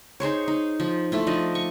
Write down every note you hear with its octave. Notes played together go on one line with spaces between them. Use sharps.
D#4 G#4 C5 C#5
D#4
F3
A3 E4 F4
F3 D4 D#4 D#5
C#6